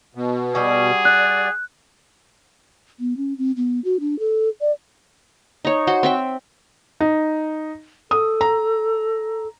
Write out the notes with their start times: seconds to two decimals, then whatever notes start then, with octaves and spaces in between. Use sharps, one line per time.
0.15 B2
0.55 G3 F#4 G#4
1.05 D5 F#6
3.00 B3
3.17 C#4
3.38 C4
3.57 B3
3.85 F#4
4.00 D4
4.19 A4
4.61 D5
5.65 D#4 C#5
5.87 F#4 C5 F#5
6.03 C4 E5 G5
7.00 D#4
8.11 A4 D#6
8.41 A#5